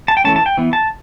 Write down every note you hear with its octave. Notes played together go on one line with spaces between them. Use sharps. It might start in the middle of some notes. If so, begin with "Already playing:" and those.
A5
G5
E3 A3 C#4 A5
A5
G5
E3 B3
A5